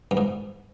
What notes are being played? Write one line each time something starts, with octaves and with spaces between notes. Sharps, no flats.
G2
G#2